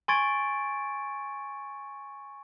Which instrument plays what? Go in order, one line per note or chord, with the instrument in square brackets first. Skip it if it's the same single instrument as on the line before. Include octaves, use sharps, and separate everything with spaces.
[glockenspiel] G#5 C6 C#6 G#6 A6 D7